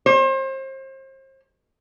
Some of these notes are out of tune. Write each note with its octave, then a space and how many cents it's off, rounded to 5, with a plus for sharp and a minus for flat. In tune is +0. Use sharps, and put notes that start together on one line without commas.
C5 +35